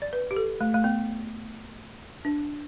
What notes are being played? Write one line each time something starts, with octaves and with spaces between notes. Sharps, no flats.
D5
B4
G4
A4
A3
A3
B3
D4